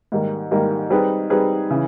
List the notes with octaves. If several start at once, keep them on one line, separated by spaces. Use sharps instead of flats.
G#2 D#3 G3 A#3
G#2 D#3 G3 A#3
G3 C4 D#4 G#4 B4
G3 C4 D#4 G#4 B4
C#3 E3